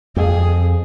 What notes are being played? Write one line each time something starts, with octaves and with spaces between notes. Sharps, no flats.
F2 G#4